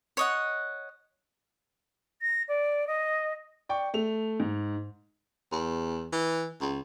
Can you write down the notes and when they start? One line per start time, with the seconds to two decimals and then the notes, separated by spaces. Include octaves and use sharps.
0.17 C#5 D#5 F#5
2.21 A#6
2.48 D5
2.87 D#5
3.69 D5 G5 C#6
3.94 A3 F7
4.40 G#2
5.52 E2
6.12 E3
6.61 C#2